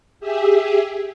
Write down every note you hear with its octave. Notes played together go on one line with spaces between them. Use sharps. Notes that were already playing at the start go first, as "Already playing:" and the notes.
G4 G#4 E5